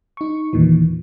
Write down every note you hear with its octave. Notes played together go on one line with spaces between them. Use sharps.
D#4 C#6
E2 A#2 D#3 E3